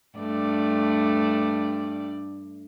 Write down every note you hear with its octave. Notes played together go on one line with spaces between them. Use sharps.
G2 A3 D5